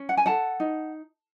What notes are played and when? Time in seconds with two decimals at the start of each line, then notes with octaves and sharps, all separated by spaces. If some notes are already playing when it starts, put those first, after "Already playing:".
Already playing: C#4
0.09 F#5
0.17 G#5
0.26 A4 F#5 A5
0.60 D#4